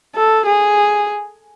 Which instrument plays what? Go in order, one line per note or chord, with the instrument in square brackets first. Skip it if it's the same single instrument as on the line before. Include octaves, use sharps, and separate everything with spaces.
[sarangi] A4
G#4